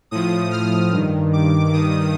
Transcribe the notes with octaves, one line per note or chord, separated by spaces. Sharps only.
A2 F3 D#6
F6
G2 D#3
D6
G2 D#3 D#6